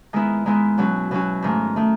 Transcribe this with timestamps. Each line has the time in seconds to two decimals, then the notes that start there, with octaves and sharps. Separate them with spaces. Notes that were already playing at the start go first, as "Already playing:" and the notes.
0.13 D#3 G#3 B3 E4
0.46 D#3 G#3 B3 E4
0.78 B2 F#3 C#4 F#4
1.11 B2 F#3 C#4 F#4
1.42 G#2 D#3 A3
1.76 D#3 A3